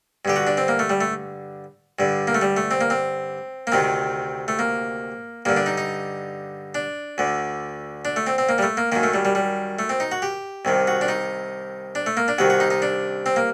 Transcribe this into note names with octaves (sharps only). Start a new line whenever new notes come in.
G2 D3 G4
F#4
D4
C4
A#3
A3
G3
A3
G2 D3
A#3
A3
G3
A3
C4
A#3
C4
A#3
D2 C3 D#3 C4
A3
A#3
G2 D3 A#3
D4
D#4
D#4
D4
D2 D3
D4
A3
C4
C4
A#3
G3
A3
A#3
F#2 D#3 A#3
A3
G3
G3
G3
A3
C4
D#4
F#4
G4
C2 C3 D#3
F#4
D4
D#4
D4
A3
A#3
D4
C2 C3 D#3 F#4
F#4
D#4
D#4
D4
C4
A#3